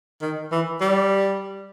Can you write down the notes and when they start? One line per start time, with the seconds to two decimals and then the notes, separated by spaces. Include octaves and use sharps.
0.22 D#3
0.52 E3
0.81 G3